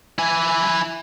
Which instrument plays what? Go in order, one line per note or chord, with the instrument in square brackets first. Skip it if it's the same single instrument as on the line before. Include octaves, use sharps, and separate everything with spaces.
[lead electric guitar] E4 G#5